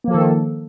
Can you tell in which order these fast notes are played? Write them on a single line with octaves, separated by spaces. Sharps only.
A#3 F3 A4 D#3